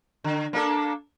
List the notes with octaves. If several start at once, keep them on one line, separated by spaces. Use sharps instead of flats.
D3
A#3 D4 A4